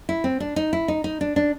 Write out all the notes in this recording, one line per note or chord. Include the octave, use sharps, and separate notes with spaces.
E4
C4
D4
D#4
E4
D#4
D#4
D4
D4